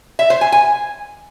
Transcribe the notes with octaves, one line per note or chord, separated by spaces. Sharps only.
E5
C5
G#5
G#5